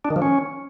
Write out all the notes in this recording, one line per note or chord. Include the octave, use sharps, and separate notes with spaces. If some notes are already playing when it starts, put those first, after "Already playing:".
D4
D#3
F3
C#4